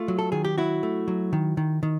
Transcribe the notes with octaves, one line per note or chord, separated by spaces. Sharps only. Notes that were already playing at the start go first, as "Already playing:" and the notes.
Already playing: A3 F4
F#3
A4
D#3 G#4
G4
F#3 E4 F#4
A3
F#3
D#3
D#3
D#3